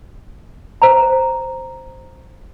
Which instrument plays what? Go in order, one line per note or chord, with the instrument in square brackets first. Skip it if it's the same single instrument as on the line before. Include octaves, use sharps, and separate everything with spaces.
[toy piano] C5 A#5